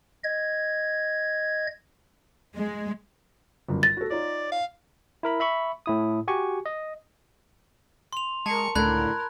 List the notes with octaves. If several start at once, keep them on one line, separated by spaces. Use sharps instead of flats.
D#5 G#6
G#3
G1 F#2
A6 A#6
F#4 A4
D#4 F4 C#5 D5
F5
E4 A#4 B5
E5 B5 C#6
A2 E4 D#6
F#4 G4 G#5 C#6
D#5
C6 F7
G#3 A#4 A5 C#6
C#2 A2 D3 D4 A#4 B5 F#6 G#6